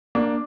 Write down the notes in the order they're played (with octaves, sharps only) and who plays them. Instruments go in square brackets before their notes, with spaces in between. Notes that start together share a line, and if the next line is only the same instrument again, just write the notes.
[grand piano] A#3 D4